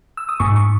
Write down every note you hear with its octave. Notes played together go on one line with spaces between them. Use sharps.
E6
D#6
G#2 C#6
C#6